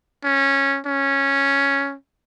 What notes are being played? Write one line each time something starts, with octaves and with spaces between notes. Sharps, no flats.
C#4
C#4